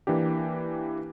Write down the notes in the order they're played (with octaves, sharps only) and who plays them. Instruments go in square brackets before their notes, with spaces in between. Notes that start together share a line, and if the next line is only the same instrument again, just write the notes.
[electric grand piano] E3 A#3 D4 G4